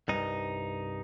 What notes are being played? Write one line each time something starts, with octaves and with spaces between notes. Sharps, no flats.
C2 G2 D#4